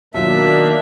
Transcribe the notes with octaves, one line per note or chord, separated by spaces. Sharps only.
B2 D#3 F#3 A#3 D4 F4 E5